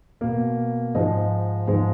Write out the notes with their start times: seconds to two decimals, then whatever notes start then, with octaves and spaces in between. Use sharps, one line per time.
0.21 B2 A#3
0.95 G#2 F3 G#3 D#5
1.67 G#2 F3 G#3